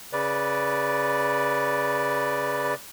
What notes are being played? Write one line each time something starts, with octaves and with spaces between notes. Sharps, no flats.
C#3 B4 D5